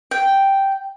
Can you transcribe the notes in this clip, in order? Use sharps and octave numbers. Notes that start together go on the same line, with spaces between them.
G5